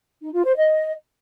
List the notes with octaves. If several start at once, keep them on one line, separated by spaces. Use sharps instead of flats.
D#4
F4
C5
D#5